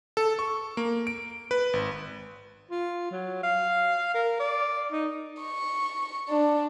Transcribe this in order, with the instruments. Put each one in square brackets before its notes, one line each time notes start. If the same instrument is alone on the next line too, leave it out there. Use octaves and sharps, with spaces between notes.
[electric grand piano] A4
C#6
A#3
D7
B4
G#1
[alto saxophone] F4
F#3
F5
A#4
D5
D#4
[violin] C#6
D4